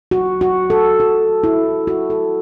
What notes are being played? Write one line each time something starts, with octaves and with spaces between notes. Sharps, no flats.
F#4
F#4
A4
F#4
E4
F#4
A4